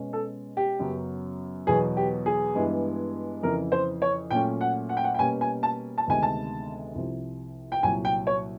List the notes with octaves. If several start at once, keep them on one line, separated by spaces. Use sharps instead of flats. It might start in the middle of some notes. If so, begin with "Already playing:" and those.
Already playing: B2 G#3 C#4
A4
G4
F#2 C#3 F#3 B3
E2 B2 F#3 G#4
G4
G#4
G2 E3 G#3 B3
F2 C#3 E3 A#4
C5
C#5
A#2 F#3 A3 C#4 G5
F#5
F#5
G5
F#5
G5
B2 G3 A#3 C#4 G#5
G#5
A5
A5
D2 C3 D#3 G#3 B3 G#5
A5
C2 C3 F3
G5
C2 A#2 F#3 G#5
G5
C#5